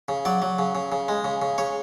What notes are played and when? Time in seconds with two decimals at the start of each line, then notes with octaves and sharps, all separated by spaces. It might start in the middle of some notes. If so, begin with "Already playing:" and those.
0.08 C#3
0.25 F#3 D5
0.42 F#3
0.59 C#3
0.75 C#3
0.92 C#3
1.08 G#3
1.24 C#3
1.42 C#3
1.58 C#3 C#5